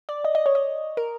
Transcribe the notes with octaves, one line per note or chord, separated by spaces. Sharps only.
D5
D#5
D#5
C#5
D#5
A#4